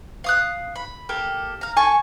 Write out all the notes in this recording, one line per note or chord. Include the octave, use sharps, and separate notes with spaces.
F5 D#6 F#6
B5
A#3 G4 A4
F5 A#5
A4 G#5 A5 C#6